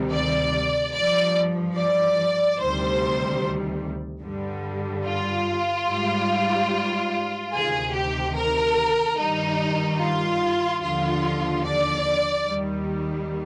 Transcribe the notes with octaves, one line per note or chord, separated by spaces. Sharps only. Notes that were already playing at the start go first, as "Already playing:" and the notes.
Already playing: D2 C3 D#3 G3
D5
G2 F3 D5
D5
D2 C3 D#3 G3 C5
G2 D3 G3
F4
G#2 G3
D2 C3 D#3 G#4
G4
A#4
G2 D#3 G3 D#4
F4
D#2 D3 F3 F4
D5
D#2 D#3 G3